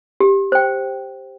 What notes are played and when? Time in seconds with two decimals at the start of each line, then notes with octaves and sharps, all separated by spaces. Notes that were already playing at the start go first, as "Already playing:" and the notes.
0.20 G4
0.52 C5 G5